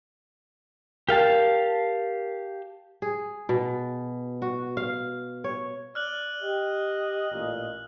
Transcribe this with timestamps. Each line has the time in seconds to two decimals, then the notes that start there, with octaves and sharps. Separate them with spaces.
1.09 G4 A#4 F5 A5
3.02 G#4
3.49 B2
4.42 F#4
4.77 F5
5.44 C#5
5.95 D5 F6 F#6 F#7
6.42 G4 D#5
7.32 A1 A#2